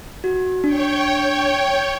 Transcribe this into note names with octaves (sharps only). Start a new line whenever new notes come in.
F#4
D4 C#5 G5